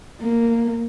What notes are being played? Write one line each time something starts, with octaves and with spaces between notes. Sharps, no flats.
A#3